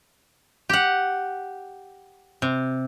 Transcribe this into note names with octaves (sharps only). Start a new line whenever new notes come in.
G4 F#5
C3